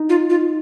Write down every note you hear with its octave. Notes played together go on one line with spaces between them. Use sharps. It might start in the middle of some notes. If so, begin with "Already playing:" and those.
Already playing: D#4
F4
F4